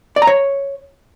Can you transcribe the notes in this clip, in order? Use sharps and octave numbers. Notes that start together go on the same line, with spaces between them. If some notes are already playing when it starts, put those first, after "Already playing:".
D5
A#5
C#5